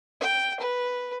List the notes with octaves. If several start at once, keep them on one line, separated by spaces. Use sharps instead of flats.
G5
B4